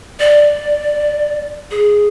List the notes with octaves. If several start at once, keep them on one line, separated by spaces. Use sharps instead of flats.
D5
G#4